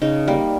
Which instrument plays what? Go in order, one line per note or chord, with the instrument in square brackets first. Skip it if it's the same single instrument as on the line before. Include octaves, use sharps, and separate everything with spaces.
[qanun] C#3 D#4
G3 A#3